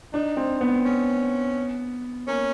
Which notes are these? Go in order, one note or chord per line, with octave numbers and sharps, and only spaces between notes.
D4 D#4
C4
B3
C#4
A#3 C#4